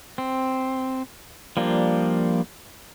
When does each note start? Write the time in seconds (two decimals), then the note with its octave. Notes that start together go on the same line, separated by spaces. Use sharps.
0.18 C4
1.57 F3 G3 A#3 D4